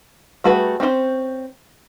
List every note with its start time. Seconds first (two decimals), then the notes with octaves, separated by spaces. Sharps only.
0.44 G3 A3 F#4 G#4 B4
0.80 C4 C#4 E4 C5